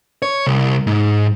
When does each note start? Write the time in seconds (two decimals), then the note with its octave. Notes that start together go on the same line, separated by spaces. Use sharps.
0.22 C#5
0.47 C2
0.87 G#2